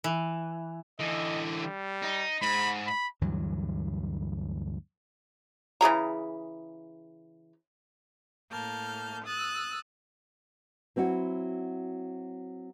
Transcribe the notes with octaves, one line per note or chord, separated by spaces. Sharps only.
E3
D3 E3 D#5
G3
D#4
G#2 B5
B5
D2 G2 E3 F#3
C#3 E3 G#4 A#5
A2 A#3 A5 F6 G6
D#6 E6 F#6 A6
F#3 C4 E4 F#4